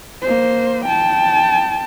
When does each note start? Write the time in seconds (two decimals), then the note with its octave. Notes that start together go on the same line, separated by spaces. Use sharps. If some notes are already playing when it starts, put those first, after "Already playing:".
0.22 A#3 C5
0.84 G5 A5